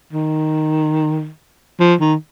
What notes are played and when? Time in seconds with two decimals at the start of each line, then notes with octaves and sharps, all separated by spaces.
0.13 D#3
1.80 F3
2.00 D#3